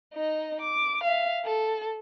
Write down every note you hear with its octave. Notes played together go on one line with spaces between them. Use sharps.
D#4 D#5
D6
E5 F5
A4